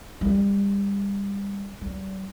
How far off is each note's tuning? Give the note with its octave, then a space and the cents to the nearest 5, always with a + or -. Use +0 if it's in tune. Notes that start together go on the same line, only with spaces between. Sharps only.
G3 +30
G3 -35